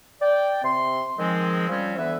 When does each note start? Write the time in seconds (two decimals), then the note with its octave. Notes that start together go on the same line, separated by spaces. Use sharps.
0.22 D5 G5
0.63 C3 C4 C6
1.18 D#3 F3 G#3 C4
1.69 F3 G3 C4 C#4
1.97 D2 D3 E3 B3 B4 E5